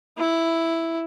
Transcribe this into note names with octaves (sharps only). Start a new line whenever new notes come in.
E4